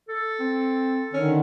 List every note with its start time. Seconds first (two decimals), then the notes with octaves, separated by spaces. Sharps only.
0.09 A4
0.40 C4
1.13 D3 D#3 C#4